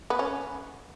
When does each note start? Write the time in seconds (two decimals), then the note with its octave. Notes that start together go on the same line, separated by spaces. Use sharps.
0.10 B3
0.19 C#4